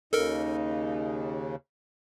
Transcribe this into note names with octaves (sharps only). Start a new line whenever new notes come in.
D#2 C#3 D#4 A4 A#4